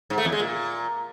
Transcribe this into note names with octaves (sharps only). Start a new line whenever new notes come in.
G#2
A3
E2
G#3
A#2